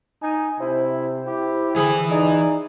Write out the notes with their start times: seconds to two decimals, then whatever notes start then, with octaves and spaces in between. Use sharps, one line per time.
0.22 D#4 G#5
0.60 C3 E4 C5
1.27 E4 G4
1.76 D3 E3 G#4 B5
2.11 D#4 G#4 D5